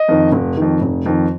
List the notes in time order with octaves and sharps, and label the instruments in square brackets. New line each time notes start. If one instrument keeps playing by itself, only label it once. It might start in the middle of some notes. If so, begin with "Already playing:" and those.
Already playing: [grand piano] D#5
F2 D#3
F1
F2 D#3
F1
F2 D#3